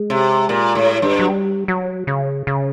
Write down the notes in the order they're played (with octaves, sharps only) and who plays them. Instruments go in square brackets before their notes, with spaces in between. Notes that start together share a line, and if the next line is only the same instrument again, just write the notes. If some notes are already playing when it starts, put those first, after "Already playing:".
Already playing: [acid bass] G#3
[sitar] C3
A#2
A2
G2
[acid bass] F#3
G3
F#3
C#3
C#3